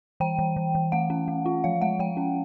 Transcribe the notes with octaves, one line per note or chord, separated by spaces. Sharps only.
E3 G5
E3
E3
E3
A3 F#5
C#4
A3
F4
F3 F5
G#3 F#5
F3 G5
C#4